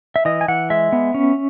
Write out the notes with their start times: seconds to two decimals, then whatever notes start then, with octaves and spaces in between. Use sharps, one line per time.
0.16 E5
0.25 E3 D#5
0.41 G#5
0.48 E3 F#5
0.70 G#3 E5
0.92 B3
1.14 C#4